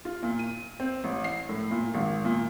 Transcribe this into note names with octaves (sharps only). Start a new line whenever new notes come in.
F4
A#2
D#7
C4
A1
C7
A2
A#2
G#1
A#2